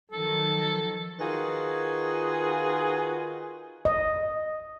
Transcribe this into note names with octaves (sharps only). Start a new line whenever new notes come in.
D#3 F3 F#3 A4
D#3 F4 F#4 G#4 B4
D#5